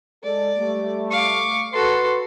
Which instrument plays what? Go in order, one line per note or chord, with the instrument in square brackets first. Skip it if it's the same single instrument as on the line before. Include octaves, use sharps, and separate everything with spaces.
[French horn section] G#3 A4 [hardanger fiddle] D5
[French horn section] G3 A3
[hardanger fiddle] F5 D6 [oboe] C#6
[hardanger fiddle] F#4 A4 [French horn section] B4 [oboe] C6